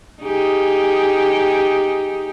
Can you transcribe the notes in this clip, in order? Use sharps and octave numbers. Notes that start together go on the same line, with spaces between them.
D#4 G4 G#4